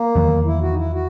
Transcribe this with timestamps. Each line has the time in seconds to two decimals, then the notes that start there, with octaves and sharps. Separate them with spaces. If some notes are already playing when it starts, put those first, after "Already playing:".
Already playing: A#3
0.15 E2 D#3 F#3
0.46 E4
0.61 F#4
0.71 D#4
0.78 E4
0.93 F#4